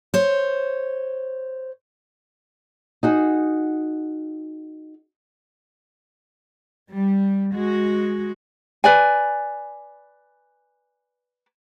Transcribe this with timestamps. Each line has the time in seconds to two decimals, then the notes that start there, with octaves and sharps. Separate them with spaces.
0.14 C5 C#5
3.03 D#4 F#4 G#4
6.91 G3
7.54 G#3 F#4
8.84 B4 D5 G#5